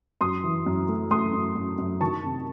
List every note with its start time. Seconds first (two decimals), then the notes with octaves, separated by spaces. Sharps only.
0.21 F#2 C6 D#6
0.44 E3
0.66 F#2
0.88 A3
1.11 A3 C6 D#6
1.34 F#2
1.56 F#2
1.79 F#2
2.01 D#3 A5 C#6
2.23 C3